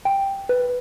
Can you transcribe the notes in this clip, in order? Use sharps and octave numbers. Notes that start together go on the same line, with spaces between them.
G5
B4